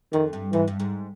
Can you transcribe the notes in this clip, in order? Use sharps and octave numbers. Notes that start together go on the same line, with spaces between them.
F2 D#3
G2
G#2 E3
G2
G#2